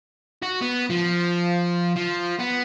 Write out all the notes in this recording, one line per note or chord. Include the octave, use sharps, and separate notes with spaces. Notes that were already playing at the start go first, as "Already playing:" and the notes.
F#4
B3
F3
F3
B3